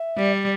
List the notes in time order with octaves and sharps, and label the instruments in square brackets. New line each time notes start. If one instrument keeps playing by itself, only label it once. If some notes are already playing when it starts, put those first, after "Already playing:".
Already playing: [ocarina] E5
[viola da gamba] G3
[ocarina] D5